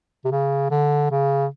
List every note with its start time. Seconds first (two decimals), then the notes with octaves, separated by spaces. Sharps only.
0.24 C3
0.32 C#3
0.70 D3
1.11 C#3